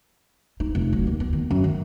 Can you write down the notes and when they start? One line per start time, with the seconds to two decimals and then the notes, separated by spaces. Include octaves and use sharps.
0.60 D#4
0.75 F1
0.93 F#3
1.07 D#2
1.20 B3
1.33 D#3
1.51 F#2
1.64 D#3